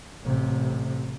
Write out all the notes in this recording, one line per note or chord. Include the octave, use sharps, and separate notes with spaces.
A1 C3